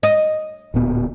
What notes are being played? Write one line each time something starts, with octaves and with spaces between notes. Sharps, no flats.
D#5
D1 A#2 B3